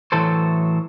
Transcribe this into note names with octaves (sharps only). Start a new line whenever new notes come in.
A2 E3 F#3 A4 C5